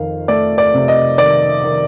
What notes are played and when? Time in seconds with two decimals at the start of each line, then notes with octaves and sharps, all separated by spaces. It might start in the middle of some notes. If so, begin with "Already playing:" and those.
Already playing: F2 D#3 F5
0.28 A3 D5
0.58 D5
0.74 C3
0.88 D#5
1.18 D#3 D5
1.64 D#3